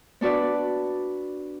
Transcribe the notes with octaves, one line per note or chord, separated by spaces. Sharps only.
B3 D4 F#4 B4 D5